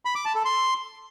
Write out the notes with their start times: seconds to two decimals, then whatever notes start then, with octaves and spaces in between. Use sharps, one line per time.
0.05 B5
0.15 D6
0.25 A5
0.35 A4
0.45 C6